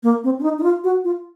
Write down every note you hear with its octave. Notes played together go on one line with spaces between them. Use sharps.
A#3
C4
C#4
D#4
D#4
F4
F#4
F4